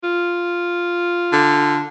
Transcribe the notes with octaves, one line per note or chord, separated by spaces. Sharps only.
F4
D3